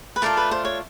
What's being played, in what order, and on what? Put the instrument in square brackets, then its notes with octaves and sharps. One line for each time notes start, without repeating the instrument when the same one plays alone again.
[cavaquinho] B4
[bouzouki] A3 D4 F4 [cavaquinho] A#4
[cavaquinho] B4
C5
C#5